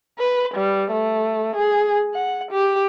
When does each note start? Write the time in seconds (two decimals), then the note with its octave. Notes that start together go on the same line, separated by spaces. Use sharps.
0.19 B4
0.54 G3
0.92 A3
1.56 G#4
2.14 F#5
2.51 G4